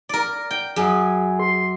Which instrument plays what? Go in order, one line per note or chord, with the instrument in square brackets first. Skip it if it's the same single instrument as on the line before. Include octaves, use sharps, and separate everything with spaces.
[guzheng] A#4 D5
G5
[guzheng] F#2 [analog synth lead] G#4
[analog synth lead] C6